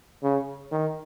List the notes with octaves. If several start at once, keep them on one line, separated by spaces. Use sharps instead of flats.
C#3
D#3